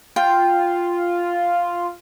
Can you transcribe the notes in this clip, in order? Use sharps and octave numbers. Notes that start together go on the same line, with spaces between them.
F4 G5